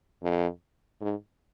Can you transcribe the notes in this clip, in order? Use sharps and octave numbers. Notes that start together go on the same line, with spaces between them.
F2
G#2